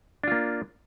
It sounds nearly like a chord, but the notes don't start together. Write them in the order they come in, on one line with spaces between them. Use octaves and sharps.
D4 F4 A#3